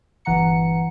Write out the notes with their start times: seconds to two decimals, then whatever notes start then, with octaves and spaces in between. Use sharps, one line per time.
0.25 G1 E3 F#5 A#5 C#7